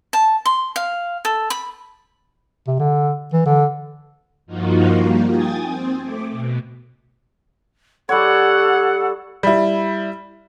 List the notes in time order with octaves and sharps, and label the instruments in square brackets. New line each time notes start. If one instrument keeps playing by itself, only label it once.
[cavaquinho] A5
C6
F5
A4
B5
[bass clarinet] C3
D3
E3
D3
[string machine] G2 F3 A#3 D#4 F4 F#4
G3 A#3
G5 G#5 D#6 G#6 A6
C4
A3 D6
B2
[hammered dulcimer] G3 C#5 [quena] A4 [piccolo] F#5
[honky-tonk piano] G3 E4